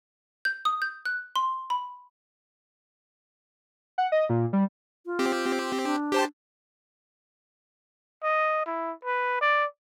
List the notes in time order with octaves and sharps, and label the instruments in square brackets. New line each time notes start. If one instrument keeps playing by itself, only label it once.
[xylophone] G6
D#6
G6
F#6
C6
B5
[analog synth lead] F#5
D#5
A#2
G3
[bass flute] F4
[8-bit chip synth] C4 G4
[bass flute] D4
[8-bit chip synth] G4 C5 A5
[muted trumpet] D#5
E4
B4
D5